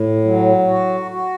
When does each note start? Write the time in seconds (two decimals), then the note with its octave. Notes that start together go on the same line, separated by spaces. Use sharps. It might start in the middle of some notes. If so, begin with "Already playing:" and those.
Already playing: A2
0.24 F#3
0.68 F#4
1.11 F#4